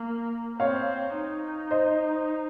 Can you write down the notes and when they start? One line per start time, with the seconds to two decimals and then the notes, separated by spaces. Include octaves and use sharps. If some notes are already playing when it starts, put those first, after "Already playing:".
Already playing: A#3
0.60 C4 C#5 F5
1.16 D#4
1.71 C5 D#5